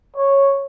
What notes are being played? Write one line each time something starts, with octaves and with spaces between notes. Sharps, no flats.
C#5